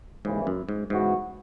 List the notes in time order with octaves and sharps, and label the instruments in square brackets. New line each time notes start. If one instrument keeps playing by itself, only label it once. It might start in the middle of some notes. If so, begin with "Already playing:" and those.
[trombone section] D#2 C#3 E3 [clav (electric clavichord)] G#2
[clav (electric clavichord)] F#2
G#2
[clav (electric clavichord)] G#2 [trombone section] C#3 E3 B3 F#4